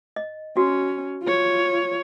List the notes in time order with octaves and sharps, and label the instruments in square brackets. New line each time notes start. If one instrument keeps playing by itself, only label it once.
[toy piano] D#5
[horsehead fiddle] C#4 [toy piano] F#4
[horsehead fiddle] F4 C#5